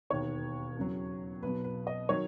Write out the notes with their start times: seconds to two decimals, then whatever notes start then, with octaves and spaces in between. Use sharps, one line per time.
0.10 E1 D#2 D#3 C#5
0.77 E2 C#3 F#3
1.42 B1 B2 F#3 B4
1.64 B4
1.87 D#5
2.09 D#3 F#3 C#5